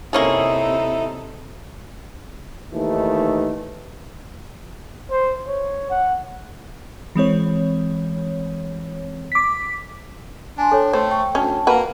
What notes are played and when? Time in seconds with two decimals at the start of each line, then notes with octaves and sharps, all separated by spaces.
0.13 C3 A#3 C#4 D#4 E4 G#4 A4
2.73 D#2 E3 A3 D#4
5.11 C5
5.47 C#5
5.90 F#5
7.16 E3 G#3 C4 C#5
9.32 D6 B6
10.58 D4 G#5 C6
10.72 A4 C#5 G5
10.93 A3 C5
11.11 G5 C#6
11.35 D2 C#4 A5
11.67 A#3 F#4 B4